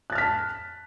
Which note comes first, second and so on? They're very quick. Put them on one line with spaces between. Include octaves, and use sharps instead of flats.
F#6 A6 F6 B6 A5